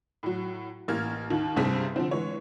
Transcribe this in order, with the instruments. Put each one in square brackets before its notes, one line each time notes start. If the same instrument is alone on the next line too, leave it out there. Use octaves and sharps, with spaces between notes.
[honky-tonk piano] A2 F#3
A1 A#3 F6 G#6
D#2 D#3
C2 G2 C3 C4 G#4 B6
D3 F3 C4
E3 G#3 C#5